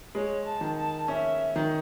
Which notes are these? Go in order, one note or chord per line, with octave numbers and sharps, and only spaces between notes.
G#3 C#5
A5
D#3
A5
C#4 E5
D#3